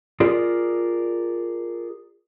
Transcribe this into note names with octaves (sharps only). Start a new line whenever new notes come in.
F4 G#4 A#4 D5